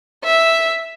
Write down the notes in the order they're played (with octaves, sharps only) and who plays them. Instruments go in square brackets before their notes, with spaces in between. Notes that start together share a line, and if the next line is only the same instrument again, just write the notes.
[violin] E5